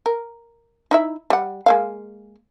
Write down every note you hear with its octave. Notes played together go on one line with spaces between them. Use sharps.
A#4
D#4 E4 E5
G3 F#5
G#3 A#3 F5